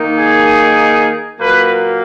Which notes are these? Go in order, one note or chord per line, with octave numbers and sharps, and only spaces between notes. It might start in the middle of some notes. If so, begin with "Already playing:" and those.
Already playing: D#3 A#3 D#4
G#4
A#2 F#3 A#3 B4